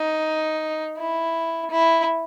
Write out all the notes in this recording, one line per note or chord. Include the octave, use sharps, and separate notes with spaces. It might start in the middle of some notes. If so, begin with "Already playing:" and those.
Already playing: D#4
E4
E4